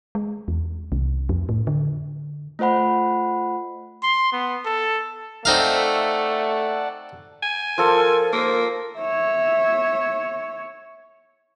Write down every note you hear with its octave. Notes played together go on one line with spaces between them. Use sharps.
G#3
E2
C2
F2
A2
D3
A3 F4 C5 F#5 B5
C6
B3
A4
A3 C4 D#4 D5 F5 F#5 A5
G#5
F3 A4 A#4
A#3 C5
C#5 E5